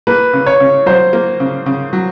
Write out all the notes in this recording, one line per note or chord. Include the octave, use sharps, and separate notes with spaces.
A#3 B4
C#3
C#5
C#3
F#3 C5
A#3
C#3
C#3
F#3